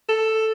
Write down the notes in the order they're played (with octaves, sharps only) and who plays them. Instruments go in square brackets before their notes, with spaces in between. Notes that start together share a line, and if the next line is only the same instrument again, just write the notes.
[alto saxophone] A4